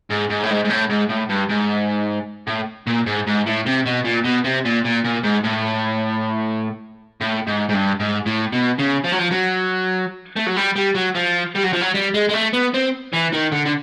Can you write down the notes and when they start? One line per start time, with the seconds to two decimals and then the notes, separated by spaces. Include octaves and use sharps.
0.11 G#2
0.30 G#2
0.43 A2
0.50 G#2
0.64 G#2
0.69 A2
0.89 G#2
1.09 A2
1.29 G2
1.49 G#2
2.47 A2
2.87 A#2
3.06 G#2
3.27 G#2
3.46 A2
3.66 C3
3.86 B2
4.05 A#2
4.25 B2
4.45 C3
4.65 A#2
4.84 A#2
5.04 A#2
5.23 G#2
5.43 A2
7.21 A2
7.47 G#2
7.69 G#2
7.73 G2
8.00 G#2
8.26 A2
8.53 B2
8.79 C#3
9.05 F3
9.13 F#3
9.19 F3
9.31 F#3
10.36 A3
10.46 F#3
10.56 G3
10.76 G3
10.95 F#3
11.15 F3
11.55 G3
11.63 F#3
11.73 F3
11.81 F#3
11.94 G3
12.14 G#3
12.29 G#3
12.33 A3
12.53 B3
12.74 C4
13.13 E3
13.33 D#3
13.52 D3
13.66 D3